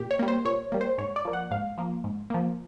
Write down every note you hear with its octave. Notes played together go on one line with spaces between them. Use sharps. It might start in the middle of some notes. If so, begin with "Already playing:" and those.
Already playing: A#2 G4
C#5
G3 A#3
C5
A#2 C#5
G3 A#3
C5
G#2 C#5
D5
F3 A#3
F#5
G#2 F5
F3 A#3
G#2
F3 A#3